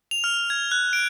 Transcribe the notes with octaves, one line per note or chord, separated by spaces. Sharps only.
F7
F6
G#6
F#6
D7